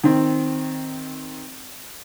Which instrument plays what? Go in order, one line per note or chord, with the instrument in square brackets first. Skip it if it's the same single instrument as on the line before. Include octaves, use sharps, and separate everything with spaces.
[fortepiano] D#3 C4